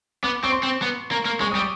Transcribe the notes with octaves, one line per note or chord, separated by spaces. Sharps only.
B3 D6
C4 C#6
C6
C4
B3
A#3
A#3
G#3 C#6
G3 D#6
D6